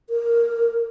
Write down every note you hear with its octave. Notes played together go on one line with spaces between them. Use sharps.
A#4